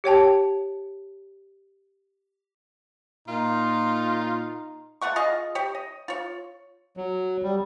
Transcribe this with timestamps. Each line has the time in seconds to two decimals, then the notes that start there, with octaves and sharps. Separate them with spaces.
0.04 G4 C#5 G5 A5
3.28 A#2 D#4 F4
5.02 A3 F4 F#5 C#6
5.16 F4 G#4 D#5 F5
5.55 G4 C#5
5.75 D#5
6.08 F4 C#5
6.97 F#3
7.43 G3